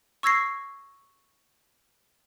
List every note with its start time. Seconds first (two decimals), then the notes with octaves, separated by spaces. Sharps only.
0.23 C#6 E6 G#6 A#6 C7